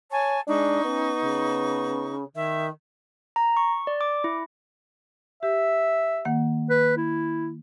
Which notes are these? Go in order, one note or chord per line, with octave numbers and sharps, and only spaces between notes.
C#5 G#5 A5 C#6
G#3 D4 D#4 C#6
B3 C#4
C#3
D#3 E5
A#5
C#6
D5
D6
E4
G4 E5
D#3 A#3 F#5
B4
E4